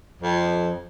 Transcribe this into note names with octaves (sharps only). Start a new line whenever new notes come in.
F2